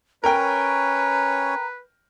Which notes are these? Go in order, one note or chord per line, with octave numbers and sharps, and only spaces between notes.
C#4 A#4 B4 C#5 G5 A#5